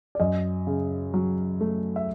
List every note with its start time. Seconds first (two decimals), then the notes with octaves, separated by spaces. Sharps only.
0.15 D5
0.20 F#2 D#5
0.67 C#3
1.14 F#3
1.61 A3
1.96 E5